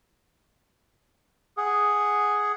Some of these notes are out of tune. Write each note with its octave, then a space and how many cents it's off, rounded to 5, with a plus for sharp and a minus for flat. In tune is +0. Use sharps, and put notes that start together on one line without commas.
G#4 +0 F#5 -5